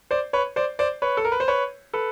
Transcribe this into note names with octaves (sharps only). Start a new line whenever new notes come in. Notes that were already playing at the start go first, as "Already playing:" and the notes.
C5 D5
B4 C#5
C5 D5
C5 D5
B4 C#5
A4
A#4
B4
C5
B4 C#5
A4 B4